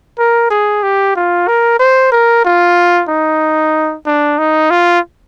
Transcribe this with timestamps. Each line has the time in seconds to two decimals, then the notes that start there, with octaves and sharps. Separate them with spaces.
0.19 A#4
0.50 G#4
0.83 G4
1.16 F4
1.48 A#4
1.79 C5
2.12 A#4
2.45 F4
3.09 D#4
4.06 D4
4.38 D#4
4.70 F4